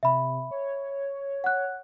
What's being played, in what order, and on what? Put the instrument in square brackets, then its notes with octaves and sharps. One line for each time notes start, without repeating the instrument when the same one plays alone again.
[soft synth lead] C3 [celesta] E5 B5
[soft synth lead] C#5
[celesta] F#5 F#6